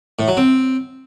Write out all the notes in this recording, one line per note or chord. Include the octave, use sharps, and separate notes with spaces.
A2
F#3
C4